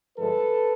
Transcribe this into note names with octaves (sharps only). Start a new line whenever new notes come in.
G2 D3 F3 G#3 A4 B4